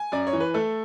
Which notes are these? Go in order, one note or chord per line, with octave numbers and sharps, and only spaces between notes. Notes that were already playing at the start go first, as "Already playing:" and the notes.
Already playing: G#5
F#2 D5
C#5
E3
B4
A3 A4